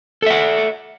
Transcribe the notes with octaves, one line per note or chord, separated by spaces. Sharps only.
A4 E5 F#5